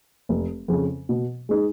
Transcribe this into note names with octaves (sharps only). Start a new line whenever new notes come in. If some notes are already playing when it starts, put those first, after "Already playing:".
F1
F2 C#3
B2
G#3 D#4 G#4